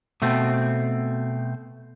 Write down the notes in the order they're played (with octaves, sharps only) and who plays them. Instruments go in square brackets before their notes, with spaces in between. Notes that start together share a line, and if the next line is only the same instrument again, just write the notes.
[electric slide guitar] B2 A3 C4